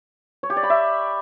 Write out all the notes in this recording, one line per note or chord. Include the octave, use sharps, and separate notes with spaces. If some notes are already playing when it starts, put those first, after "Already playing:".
C#5
G4
D5
B5
E5